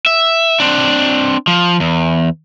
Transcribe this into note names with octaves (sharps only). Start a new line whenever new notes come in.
E5
C4 D4
F3
E2